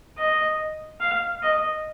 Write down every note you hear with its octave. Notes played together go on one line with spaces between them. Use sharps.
D#5
F5
D#5